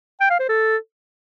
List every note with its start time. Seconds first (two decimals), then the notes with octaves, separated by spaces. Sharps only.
0.20 G5
0.30 F5
0.39 C5
0.49 A4